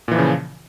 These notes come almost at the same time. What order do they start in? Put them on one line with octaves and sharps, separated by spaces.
A#2 E3 F3 C#3